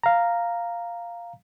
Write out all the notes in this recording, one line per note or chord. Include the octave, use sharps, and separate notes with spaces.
F5 A#5